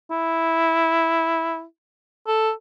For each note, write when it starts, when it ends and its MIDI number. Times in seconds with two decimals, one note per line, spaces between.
0.11 1.63 64
2.27 2.51 69